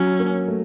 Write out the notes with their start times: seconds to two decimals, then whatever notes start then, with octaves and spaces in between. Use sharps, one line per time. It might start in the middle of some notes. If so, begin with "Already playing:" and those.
Already playing: F#3 C#4
0.19 A#3
0.48 A3